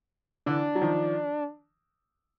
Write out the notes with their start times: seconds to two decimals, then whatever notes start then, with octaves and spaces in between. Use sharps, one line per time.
0.46 D3 E3 D4
0.75 F#3
0.81 D#3 F3